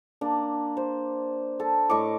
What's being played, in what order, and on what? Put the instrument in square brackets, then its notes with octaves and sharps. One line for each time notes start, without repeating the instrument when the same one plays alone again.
[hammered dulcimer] A#3 D4
C5
A4
A2 D#5 C#6 D6